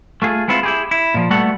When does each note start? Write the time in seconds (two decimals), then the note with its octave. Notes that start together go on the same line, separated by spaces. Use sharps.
0.22 A3 F4 G#4
0.48 G#3 B3 C4 E4 F4
0.63 E4 G4 G#4
0.91 E4
1.14 A#2 F3
1.30 G3 A3 B3 F#4 A4 F#5